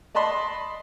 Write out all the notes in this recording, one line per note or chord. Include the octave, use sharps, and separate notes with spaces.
D5 D#5 A5 B5 C6